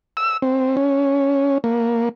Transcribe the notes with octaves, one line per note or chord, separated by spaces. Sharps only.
E6
C4
C#4
A#3